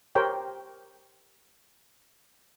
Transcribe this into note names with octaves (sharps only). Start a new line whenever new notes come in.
G4 A#4 C5 C#5 G5